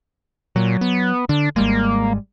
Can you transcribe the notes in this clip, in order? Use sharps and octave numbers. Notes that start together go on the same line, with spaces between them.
A#2 F#3
B3
D3 D4
G#1 G3 G#3 A#3